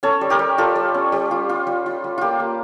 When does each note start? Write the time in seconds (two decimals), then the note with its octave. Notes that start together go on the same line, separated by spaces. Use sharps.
0.03 C#4 A4 C#5
0.21 G3
0.30 G4 A#4
0.39 G3
0.58 G3 F4 A4
0.76 G3
0.94 C#4
1.12 G3
1.31 F4
1.49 F4
1.67 G3
1.86 F4
2.04 G3
2.18 A#3 F4 G4
2.40 A#3